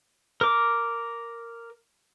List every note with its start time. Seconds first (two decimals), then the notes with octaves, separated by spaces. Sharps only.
0.41 A#4 D6